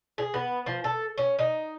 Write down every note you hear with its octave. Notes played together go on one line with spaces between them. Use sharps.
G#4
B3
F3
A4
C#4
D#4